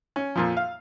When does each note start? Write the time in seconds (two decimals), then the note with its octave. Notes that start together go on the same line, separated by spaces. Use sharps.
0.16 C#4
0.36 F2 A#2 F3
0.57 F5